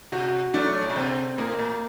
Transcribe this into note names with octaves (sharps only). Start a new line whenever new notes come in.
C3 F#4
F#3 A3 D4
A2
A#2
C3 C4
A2 A#3
A#2